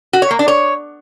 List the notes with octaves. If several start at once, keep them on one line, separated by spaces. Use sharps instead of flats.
F#4
C#5
A#3
D4
C#5